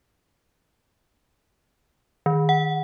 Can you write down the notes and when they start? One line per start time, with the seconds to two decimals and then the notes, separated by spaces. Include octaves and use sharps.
2.26 D#3
2.49 F#5